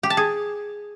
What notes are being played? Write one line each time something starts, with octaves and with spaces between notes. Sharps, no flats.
G4
A5
G#4